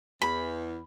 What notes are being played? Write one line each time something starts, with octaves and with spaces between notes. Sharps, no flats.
E2 B5